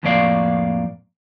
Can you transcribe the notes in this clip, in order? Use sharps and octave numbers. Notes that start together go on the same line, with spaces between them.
F2 A2 F3 A#3 D5 F5